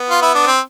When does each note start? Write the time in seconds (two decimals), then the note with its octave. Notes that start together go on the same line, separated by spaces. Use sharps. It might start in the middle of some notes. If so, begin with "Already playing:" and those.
Already playing: B3
0.10 F4
0.22 E4
0.35 D4
0.47 C4